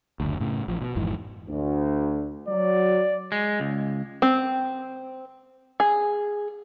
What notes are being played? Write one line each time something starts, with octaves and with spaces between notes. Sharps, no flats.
F#1 D2
A2 C#3
A1 F3
B2
G#1 F2 G#2 E3
D2
F#3 D5
G#3
C#2
C4
G#4